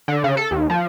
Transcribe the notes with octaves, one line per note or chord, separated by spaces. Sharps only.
D3
C#3
A4
D#2
F3